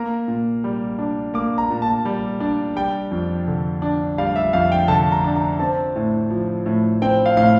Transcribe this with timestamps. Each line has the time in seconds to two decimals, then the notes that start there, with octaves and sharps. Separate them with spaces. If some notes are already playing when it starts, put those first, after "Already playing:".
Already playing: A#3 A#5
0.28 A#2
0.64 G3
0.99 D4
1.34 A#3 D6
1.58 A#5
1.70 A#2
1.82 A5
2.05 G3
2.40 D4
2.76 G3 G5
3.11 F2
3.48 D3
3.82 D4
4.18 G3 F5
4.36 E5
4.53 F2 F5
4.72 G5
4.88 D3 A5
5.12 A#5
5.24 D4
5.36 A#5
5.59 C4 A5
5.96 A2
6.30 F3
6.66 A2
7.02 C4 G5
7.26 F5
7.37 A2 F5